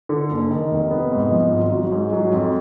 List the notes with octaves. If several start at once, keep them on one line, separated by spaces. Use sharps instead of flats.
D3
F#1
D#3
F1
B3
G#2
F3
G#1
F#3
G#2
F#3
F2